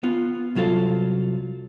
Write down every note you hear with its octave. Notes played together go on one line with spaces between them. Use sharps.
B3 F4
C2 F#3 F4 A4 F5